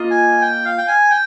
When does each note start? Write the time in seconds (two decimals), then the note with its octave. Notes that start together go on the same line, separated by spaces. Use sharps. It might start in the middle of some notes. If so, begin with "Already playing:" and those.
Already playing: A#3 F4 D#5
0.11 G#5
0.41 G5
0.65 F5
0.78 G5
0.88 G#5
1.10 G5